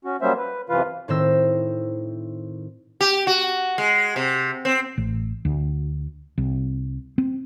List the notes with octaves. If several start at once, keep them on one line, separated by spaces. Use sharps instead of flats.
C#4 F#4
F#3 G3 A#3 C#4 C5 E5
B4
F#2 C3 E3 F4 B4 F5
A2 D#3 C4 C5 E6 A#6
G4
F#4
G#3
C3
C4
A1
D2
C2
C4